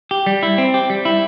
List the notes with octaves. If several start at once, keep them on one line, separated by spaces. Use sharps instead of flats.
G4
G3
E4
C4
G4
G3
E4